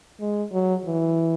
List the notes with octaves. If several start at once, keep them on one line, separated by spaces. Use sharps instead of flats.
G#3
F#3
E3